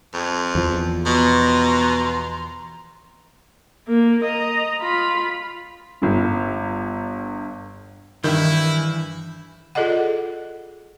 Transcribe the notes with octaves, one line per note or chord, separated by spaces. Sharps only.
F2
E2 F3
B2 A#5 C6
A#3
D#5 A#5
F4 B5
G1 G2
G2 D#3 E3 E4 G6
F4 G#4 A4 D5 D#5 F#5